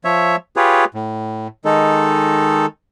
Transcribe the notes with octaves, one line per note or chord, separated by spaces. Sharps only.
F3 C#5 E5
F4 G4 G#4 B4 C#5
A2
D#3 G#3 D#4 A4